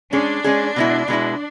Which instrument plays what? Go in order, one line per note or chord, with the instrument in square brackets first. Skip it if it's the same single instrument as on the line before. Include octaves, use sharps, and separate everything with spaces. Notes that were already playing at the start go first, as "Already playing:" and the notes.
[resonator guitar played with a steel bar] G#3 C#4 G#4 [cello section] D4
[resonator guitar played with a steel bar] G#3 C#4 G#4
B2 G#3 B3 E4
B2 G#3 B3 E4